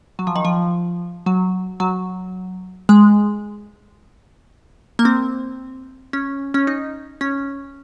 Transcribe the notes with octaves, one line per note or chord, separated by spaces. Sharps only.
F#3
F3
D#3
F3
F#3
F#3
G#3
A#3
C4
C#4
C#4
D#4
C#4